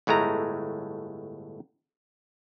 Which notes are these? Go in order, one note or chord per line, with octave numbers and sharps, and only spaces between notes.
G1 A2 G#3 A3 A#5